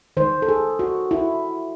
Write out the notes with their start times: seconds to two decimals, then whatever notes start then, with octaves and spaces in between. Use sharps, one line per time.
0.17 D#3 G#3 C5
0.42 A4
0.49 G#4
0.79 F#4
1.11 E4